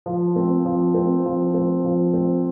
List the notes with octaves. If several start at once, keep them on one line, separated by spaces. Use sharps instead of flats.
F3
C4
F3
C4
F3
C4
F3
C4